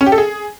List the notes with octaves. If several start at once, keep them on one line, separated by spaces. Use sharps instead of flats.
C#4
G4
A4
G#4